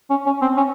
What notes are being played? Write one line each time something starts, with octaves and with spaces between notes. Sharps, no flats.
C#4
C#4
C4
C#4